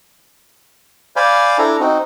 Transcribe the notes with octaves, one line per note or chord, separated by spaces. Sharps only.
C5 D5 F5 G#5 B5
D4 E4 A4 A#5
C4 D#4 F#4